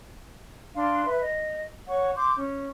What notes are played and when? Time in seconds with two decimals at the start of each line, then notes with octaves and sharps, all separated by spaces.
0.76 D4 F5 C6
1.06 B4 E5
1.22 D#5
1.88 C#5 F#5 C#6
2.16 C6 D6 G6
2.36 C#4